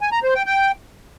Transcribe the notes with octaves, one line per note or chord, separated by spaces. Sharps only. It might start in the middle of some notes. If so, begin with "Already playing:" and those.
G#5
A#5
C5
G5
G5